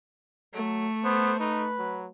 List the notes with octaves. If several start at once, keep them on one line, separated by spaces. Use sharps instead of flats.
F#3 A3
B3 C5
D#4 B4
F#3